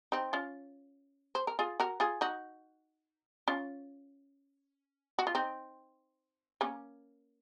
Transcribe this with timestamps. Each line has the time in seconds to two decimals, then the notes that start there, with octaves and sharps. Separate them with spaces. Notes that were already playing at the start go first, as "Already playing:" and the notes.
0.12 C4 D#4
0.33 C#4 F4
1.35 C5
1.47 A#4
1.59 F4 G#4
1.80 F#4 A#4
2.00 F4 G#4
2.21 D#4 F#4
3.48 C#4 F4
5.19 F#4
5.27 F4
5.35 C4 D#4
6.61 A#3 C#4